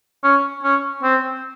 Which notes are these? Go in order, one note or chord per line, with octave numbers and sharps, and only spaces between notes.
C#4
C#4
C4